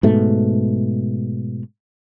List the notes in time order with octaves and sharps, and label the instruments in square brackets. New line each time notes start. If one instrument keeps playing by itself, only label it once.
[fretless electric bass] G#2 B2 A3